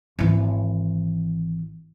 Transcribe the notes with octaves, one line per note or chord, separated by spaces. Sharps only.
G#1 E3